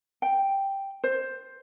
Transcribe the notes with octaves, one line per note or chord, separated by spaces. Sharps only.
G5
C5